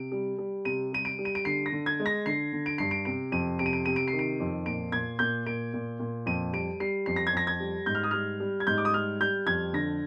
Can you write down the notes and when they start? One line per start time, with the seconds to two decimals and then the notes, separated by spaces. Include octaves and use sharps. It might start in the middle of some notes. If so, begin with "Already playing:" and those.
Already playing: C3 D7
0.12 G3
0.38 G3
0.65 C3 D#7
0.93 G3 D#7
1.05 D7
1.19 G3
1.25 D#7
1.35 D7
1.45 D3 C7
1.66 A#6
1.72 D3
1.86 G#6
2.00 G#3
2.06 A#6
2.26 D3 C7
2.53 D3
2.66 D7
2.78 G2 C7
2.91 D7
3.05 C3 D7
3.32 F2 D#7
3.59 C3 D7
3.66 D#7
3.73 D7
3.85 C3 D#7
3.96 D7
4.08 C7
4.13 D#3
4.19 D7
4.40 F2
4.66 A#2 D7
4.92 A#2 G#6
5.19 A#2 G6
5.46 A#2 D7
5.74 A#2
5.99 A#2
6.26 F2 D#7
6.53 G3 D7
6.80 G3 C7
7.06 F2 C7
7.16 A#6
7.27 G#6
7.33 F2 A#6
7.47 G#6
7.60 G3
7.86 G#2 G6
7.95 F6
8.04 D#6
8.11 G3 F6
8.40 G3
8.60 G#6
8.67 G#2 G6
8.78 D6
8.85 D#6
8.93 G3 F6
9.20 G3 G6
9.46 F2 G#6
9.73 D3 A#6